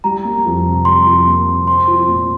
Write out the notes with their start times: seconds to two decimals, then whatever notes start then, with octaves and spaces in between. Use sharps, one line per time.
0.04 G3 A#5
0.25 A#3
0.45 F2
0.65 C3
0.85 G3 C6
1.06 F2
1.27 A#3
1.47 C3
1.67 C4 C6
1.88 F3
2.08 A#2